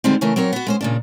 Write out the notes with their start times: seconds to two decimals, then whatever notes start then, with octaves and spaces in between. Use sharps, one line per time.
0.04 D3 D#3 G3 G#3 B3 C4
0.21 C#3 E3 A3 A#4
0.36 F#3 C4 A#4 C#5
0.53 B3 F#4
0.67 G#3 C#4 C5
0.81 A#2 C#3 D4